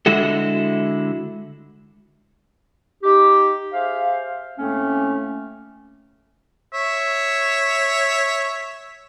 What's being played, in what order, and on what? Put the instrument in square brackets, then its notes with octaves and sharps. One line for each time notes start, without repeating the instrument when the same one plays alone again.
[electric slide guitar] D3 G#3 E4 F#4 A4
[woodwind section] D#4 G4
G#4 C5 E5 F5
A2 A3 A#3 C4 C#4
[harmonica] C#5 E5